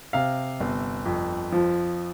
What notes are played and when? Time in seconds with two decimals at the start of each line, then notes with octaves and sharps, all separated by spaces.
0.13 C3 F5
0.60 G1
1.06 F2
1.52 F3